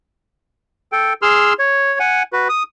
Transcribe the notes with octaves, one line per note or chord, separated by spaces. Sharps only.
A4 G5
G#4 C6 E6 F6
C#5
F#5 G#5
F#4 B4
D#6